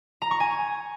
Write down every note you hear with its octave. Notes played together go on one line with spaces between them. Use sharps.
A#5
C#6
G#5